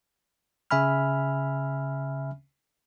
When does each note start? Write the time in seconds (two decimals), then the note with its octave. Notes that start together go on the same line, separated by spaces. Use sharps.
0.71 C#3 E5 G#5 B5 F6